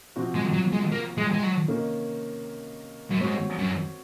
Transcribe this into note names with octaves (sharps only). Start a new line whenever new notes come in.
C3 F3 C4 F#4
G#3
F#3
G#3
A#3
G#3
G#3
F#3
C3 D#3 A#3 C#4
F#2
G#2 C4 F#4 C#5
F#2